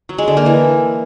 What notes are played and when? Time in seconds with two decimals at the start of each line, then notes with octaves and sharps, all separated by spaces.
0.09 F#3
0.18 G#3
0.28 D3
0.37 A#3
0.46 E3